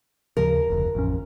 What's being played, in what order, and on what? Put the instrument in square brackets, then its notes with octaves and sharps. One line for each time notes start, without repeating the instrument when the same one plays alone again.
[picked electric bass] D#2 C#3 F3 [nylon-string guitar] A#4
[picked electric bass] F1 D2
A1 F2 C#4